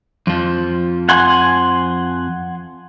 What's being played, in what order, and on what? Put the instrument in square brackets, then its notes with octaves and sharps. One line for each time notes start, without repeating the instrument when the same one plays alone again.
[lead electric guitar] F2 F3
[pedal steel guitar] F#5 G#5 C6